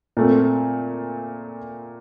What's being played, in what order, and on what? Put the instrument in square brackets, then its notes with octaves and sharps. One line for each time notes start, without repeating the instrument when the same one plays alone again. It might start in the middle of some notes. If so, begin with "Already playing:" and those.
[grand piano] A#2 A3 C4